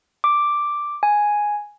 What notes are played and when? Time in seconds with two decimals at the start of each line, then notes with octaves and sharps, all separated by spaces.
0.24 D6
1.03 G#5